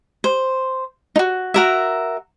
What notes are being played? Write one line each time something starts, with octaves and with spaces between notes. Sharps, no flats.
C5
D#4 F#4
F#4 A#4 E5